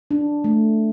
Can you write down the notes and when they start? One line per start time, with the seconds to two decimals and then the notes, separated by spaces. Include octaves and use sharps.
0.11 D4
0.44 A3